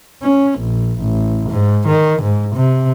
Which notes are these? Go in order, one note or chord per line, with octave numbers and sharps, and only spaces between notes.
C#4
A#1
A1
G#2
D#3
G#2
C3